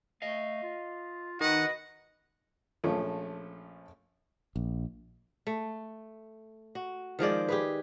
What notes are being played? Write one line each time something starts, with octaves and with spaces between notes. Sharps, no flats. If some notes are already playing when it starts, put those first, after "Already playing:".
A3 D#5 F5
F4
D#3 F#4 B4 D#5 F#5
A#1 F3 A3 C#4
A#1
A3
F#4
D#3 F3 G#3 D5
G4 G#4 B4